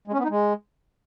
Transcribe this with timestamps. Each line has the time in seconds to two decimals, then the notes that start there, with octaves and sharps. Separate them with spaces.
0.08 G#3
0.13 C#4
0.19 B3
0.24 D#4
0.30 G#3